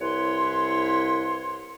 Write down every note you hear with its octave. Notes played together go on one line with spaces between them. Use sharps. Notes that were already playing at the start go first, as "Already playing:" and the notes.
C2 E4 B4 C#5 C6